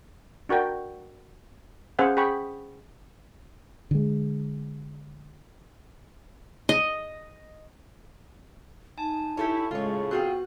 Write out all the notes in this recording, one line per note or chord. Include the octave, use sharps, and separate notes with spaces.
D4 F#4 A#4 G5
C#4 G#4 C5 F5 F#5
G#4 G5 B5 C#6
D3 G#3
D#5
D#4 G#5 A5
E4 G4 A4 C#5
A2 C#3 G#3 F4 C#5
B3 C4 F4 F#4 G#4 G5 F#6